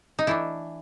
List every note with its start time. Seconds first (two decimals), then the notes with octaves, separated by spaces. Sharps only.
0.19 D#4
0.27 E3 A3 D4 E4